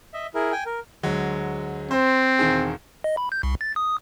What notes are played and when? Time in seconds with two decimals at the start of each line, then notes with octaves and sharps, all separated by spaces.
0.14 D#5 E5
0.35 E4 G#4 A#4
0.52 G5 G#5
0.66 A#4
1.03 D2 F#3 G#3
1.91 C4 C5
2.39 E1 D#3 G#4
3.04 D#5
3.17 B5
3.32 G6
3.43 C2
3.61 A6
3.76 D#6